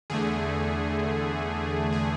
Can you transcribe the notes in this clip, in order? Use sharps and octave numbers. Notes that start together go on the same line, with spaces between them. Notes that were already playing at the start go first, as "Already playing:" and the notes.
E2 D3 A3 G#4
G#4